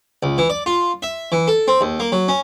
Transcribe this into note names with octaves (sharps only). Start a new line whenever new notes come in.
C#2
E3
D5
F4
E5
E3
A4
C4
D#2
A#3
F#3
C#4